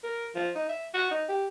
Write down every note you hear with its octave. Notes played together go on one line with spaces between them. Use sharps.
A#4
F3
D#4
E5
F#4
D#4
G4